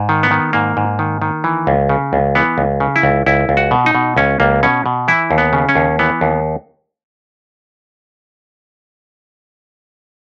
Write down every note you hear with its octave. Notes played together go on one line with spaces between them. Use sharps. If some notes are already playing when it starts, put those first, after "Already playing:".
Already playing: G#2
D#3
B3
D#3
G#2 A#3
G#2
D#3
D#3
E3
C#2
C#3
C#2
E3 B3
C#2
C#3
E4
C#2
C#2 E4
C#2
F#4
B2
D#4
B2
C#2 C#4
C#2 A#3
B2 C#4
B2
E3 E4
D#2
B3
C#3
C#4
D#2
E3 B3
D#2